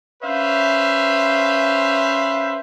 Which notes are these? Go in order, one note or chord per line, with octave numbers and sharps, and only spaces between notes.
C#4 B4 C5 E5 F5